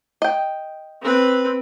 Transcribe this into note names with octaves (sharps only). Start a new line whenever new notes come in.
D#5 G5
C4 B4